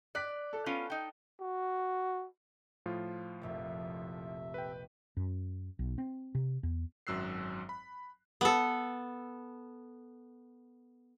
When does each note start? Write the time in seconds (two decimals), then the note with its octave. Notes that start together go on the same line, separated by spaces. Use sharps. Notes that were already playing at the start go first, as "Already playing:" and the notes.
0.15 D5 F#6 B6
0.53 A4
0.66 B3 C#4 F4
0.90 D#4 G5
1.41 F#4
2.86 A2 F3 F4
3.42 F1 A#1 F2 C3 A3 E5
4.54 B4 G5
5.17 F#2
5.79 B1
5.98 C4
6.35 C3
6.63 E2
7.07 G#1 F#2 F#3 E6 F#6 C7
7.69 B5
8.41 B3 A4